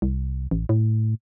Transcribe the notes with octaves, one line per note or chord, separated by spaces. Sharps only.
C2
A1
A2